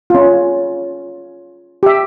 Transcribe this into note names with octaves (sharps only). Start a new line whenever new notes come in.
C#4 F4
G4 E5